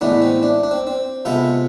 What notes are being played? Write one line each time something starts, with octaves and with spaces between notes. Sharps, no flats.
A2 E3 G#3 B3 D4
C4
D4
D4
C4
C4
C3 G#3 B3 F4 A4